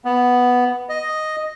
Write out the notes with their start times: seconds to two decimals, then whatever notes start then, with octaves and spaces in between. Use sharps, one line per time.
0.05 B3
0.89 D#5